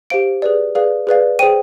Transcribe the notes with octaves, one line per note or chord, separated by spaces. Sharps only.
G4 C5 F5 D7
G#4 B4 D5
G#4 B4 D5 F5
G#4 B4 D5 F5
G#4 C5 G5 D#7